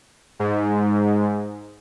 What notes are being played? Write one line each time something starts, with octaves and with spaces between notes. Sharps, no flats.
G#2